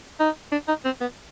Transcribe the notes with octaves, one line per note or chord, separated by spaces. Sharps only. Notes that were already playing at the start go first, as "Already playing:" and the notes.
D#4
D4
D#4
C4
B3